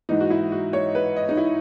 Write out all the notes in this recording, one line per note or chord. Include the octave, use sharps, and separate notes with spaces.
G#2 E3 D#4
F#4
E4
F#4
C#5
B4
D#5
D#4
E4